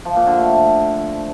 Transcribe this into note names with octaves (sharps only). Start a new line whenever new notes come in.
F3
A#2
D3
A3